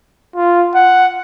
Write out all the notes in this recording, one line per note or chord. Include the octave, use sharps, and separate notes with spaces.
F4
F#5